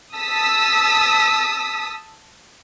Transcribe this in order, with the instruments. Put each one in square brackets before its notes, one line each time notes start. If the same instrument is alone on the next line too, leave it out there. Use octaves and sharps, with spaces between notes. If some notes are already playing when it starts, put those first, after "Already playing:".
[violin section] A5 D#6 E6 B6